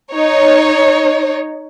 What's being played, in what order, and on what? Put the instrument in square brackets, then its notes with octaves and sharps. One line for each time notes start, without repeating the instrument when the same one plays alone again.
[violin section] D#4 C#5